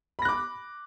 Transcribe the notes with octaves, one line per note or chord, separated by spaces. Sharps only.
B5 D6 F#6 A#6